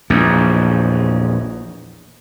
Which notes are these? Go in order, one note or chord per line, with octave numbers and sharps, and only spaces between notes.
A#1 E2